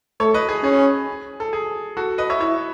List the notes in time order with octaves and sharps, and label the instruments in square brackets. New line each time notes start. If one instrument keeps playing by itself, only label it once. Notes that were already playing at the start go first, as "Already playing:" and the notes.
[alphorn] A3 [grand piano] A4 C#5
[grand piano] B4 D#5
G#4
[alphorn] C#4 [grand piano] G#4
[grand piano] A4
G#4
F#4 A4
B4 D#5
C#5 E5
[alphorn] E4 [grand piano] C#5 E5